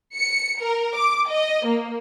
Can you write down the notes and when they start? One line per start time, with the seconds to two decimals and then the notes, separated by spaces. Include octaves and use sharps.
0.16 C#7
0.60 A#4
0.96 D6
1.29 D#5
1.66 A#3